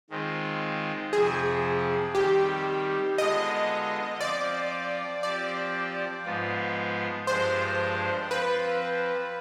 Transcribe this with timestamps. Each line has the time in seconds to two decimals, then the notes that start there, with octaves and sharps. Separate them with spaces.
0.10 D#3 G#3 C4 F4
1.13 F2 C3 F3 C4 G#4
2.15 D#3 G3 C4 G4
3.18 D3 G#3 B3 F4 D#5
4.21 F3 C4 F4 D5
5.22 F3 C4 G4 D5
6.25 G#2 F3 B3 F4
7.27 G2 F3 G#3 D4 G4 C5
8.30 F3 C4 F4 B4